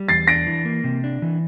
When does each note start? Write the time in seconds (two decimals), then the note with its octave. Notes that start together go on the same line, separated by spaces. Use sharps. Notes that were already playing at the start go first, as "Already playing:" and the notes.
Already playing: G3
0.09 E2 A6 C7
0.28 D4 A#6 D7
0.47 E3
0.65 A#3
0.84 C3
1.04 D4
1.22 E3